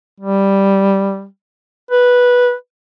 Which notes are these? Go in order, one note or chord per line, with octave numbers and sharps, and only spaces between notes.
G3
B4